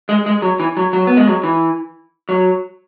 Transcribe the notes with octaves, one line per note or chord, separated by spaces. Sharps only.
G#3
G#3
F#3
E3
F#3
F#3
B3
G#3
F#3
E3
F#3